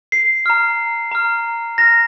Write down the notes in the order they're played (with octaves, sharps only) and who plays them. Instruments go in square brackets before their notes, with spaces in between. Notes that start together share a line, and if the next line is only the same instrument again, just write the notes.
[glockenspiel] C7
A#5 F6
A#5 F6
A#5 F6 A#6